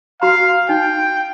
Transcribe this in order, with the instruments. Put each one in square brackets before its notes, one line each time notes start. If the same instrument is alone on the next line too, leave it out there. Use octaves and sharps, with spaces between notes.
[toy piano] F#4 A#5 [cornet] F5
[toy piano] D#4 [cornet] G5